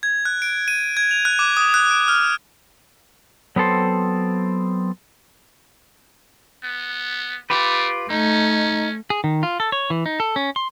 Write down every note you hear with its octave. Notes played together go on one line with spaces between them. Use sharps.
G#6
F#6
D7
D#7
G#6
F7
F#6
D6
D#6
F#6
D7
F6
F#3 B3 C4 A4 C5
B3
A3 F4 G4 B4
A3 C#4 D#4
G#4
D#3
F4
A4
C#5
E3
D#4
A4
C#4
C6